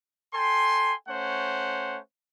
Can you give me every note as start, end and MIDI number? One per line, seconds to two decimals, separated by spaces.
0.33 0.94 69
0.33 0.94 79
0.33 0.94 80
0.33 0.94 84
1.08 1.99 57
1.08 1.99 61
1.08 1.99 72
1.08 1.99 73
1.08 1.99 78